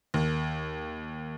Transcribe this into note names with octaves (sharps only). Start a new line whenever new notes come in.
D#2